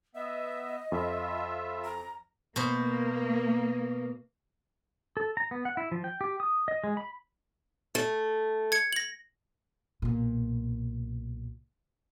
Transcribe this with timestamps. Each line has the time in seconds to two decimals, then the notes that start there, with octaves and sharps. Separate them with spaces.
0.15 B3 D#5 E5
0.92 F2 F4 E5
1.84 A#5
2.56 B2 A#3 C5
5.17 A4
5.37 A#5
5.51 B3
5.65 F#5
5.77 E4
5.92 F3
6.04 G5
6.21 G4
6.40 D#6
6.68 D#5
6.84 G#3
6.97 B5
7.95 A3
8.72 G#6 C#7
8.93 A#6 F#7
10.02 B1 A#2